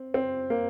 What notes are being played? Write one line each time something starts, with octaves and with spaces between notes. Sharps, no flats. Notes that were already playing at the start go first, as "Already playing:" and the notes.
Already playing: C4
C4
A#3